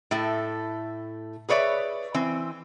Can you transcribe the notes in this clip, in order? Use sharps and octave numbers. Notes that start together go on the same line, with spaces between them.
A2 A3
G#4 B4 C#5 D5 E5
E3 C4